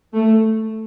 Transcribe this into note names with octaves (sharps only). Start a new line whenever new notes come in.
A3